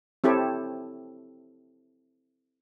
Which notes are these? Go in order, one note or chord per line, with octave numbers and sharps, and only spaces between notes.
C4 E4 G4 A4 C#5